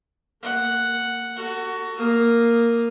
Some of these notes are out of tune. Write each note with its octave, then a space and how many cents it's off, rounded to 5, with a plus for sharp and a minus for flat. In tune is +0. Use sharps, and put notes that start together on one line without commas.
A#3 -20 F#5 +0
F#4 +15 A4 +40
A#3 +0 D#6 -5